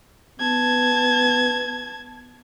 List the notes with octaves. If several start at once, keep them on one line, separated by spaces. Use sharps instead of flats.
B3 A5 G#6